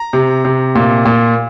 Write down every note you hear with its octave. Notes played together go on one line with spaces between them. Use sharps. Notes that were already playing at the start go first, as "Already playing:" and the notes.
Already playing: A#5
C3
C3
A#2
A#2